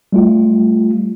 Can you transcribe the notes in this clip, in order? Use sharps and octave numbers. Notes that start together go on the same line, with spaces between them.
G3 A3 F4